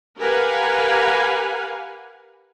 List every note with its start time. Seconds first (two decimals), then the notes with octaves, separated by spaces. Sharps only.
0.18 G4 A#4 B4 F5 F#5 G#5